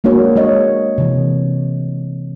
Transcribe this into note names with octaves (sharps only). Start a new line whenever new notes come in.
G#3 A#3 D4 F#4 C#5
G#3 A#3 C#5 D#5
C3 E3